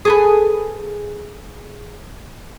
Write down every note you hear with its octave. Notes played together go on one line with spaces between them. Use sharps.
G#4 A4 B4